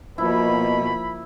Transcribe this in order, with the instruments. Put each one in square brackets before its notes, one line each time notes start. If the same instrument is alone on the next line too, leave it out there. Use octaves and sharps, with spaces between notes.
[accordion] B2 [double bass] F3 A#3 [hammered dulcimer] E4 [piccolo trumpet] B5